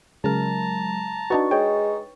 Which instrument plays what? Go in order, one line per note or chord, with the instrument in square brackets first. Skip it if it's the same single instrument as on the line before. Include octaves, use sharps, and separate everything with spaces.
[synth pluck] C#3 A#4 [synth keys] F#3 G#3 [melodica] A5 A#5
[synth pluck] D4 D#4 F#4 [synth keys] B4 C#6 A6
[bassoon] G#3 [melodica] D#4 [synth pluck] C#5 G5